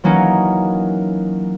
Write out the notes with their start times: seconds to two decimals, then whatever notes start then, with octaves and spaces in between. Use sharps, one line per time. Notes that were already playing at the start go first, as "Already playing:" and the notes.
0.04 E3 F#3 A#3 C#4 D#4